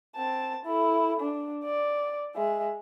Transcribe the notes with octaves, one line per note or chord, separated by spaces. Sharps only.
C4 A5
E4 A4
D4
D5
G#3 E5